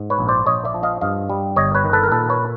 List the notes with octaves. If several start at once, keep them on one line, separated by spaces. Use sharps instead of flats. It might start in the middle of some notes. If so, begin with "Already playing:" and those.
Already playing: G#2
B4 C#5
A#1
C5 D5
A#1 C#5 D#5
D5 E5
F3
D#5 F5
G2 D#5 F5
G3
G1 C#5 D#5
B4 C#5
D#3
A4 B4
A#4
A#2 A4 B4
B4 C#5